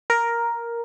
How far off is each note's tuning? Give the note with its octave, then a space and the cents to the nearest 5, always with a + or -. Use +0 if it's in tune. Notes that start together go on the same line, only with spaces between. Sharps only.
A#4 +5